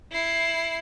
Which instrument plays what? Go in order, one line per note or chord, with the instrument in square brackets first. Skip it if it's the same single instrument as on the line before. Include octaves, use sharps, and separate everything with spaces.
[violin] E4 C7